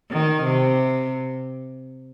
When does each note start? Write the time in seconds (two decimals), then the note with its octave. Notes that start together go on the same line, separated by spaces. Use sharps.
0.11 D#3
0.43 C3